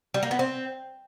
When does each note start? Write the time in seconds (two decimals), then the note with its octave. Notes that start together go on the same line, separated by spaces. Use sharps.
0.14 G3
0.23 A#3
0.31 B3
0.39 C4